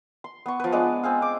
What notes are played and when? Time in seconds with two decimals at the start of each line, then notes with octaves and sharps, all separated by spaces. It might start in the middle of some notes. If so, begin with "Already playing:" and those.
0.24 C6
0.46 B3 C#6
0.60 F3 B4
0.72 G#3 B3 D4
1.03 C4 G#4 F5
1.22 D6